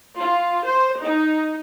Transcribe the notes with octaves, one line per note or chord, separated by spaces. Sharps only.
F4
C5
D#4